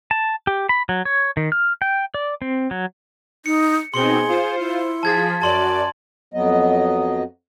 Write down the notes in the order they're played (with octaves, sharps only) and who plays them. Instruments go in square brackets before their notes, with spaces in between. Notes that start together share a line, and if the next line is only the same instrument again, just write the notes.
[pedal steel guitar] A5
G4
B5
F#3
C#5
D#3
F6
G5
D5
C4
F#3
[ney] D#4 [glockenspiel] C#7
[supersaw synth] B2 C4 D#4 [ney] G#4 [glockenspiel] C6 C#7 G7
[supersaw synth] F4 C5
[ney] E4
[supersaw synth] F3 G#4 B6 [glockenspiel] A5 G#6 A6
[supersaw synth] F#2 D5 [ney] F#4 [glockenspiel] A5 C6 F#7
[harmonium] F2 F#3 B3 D#5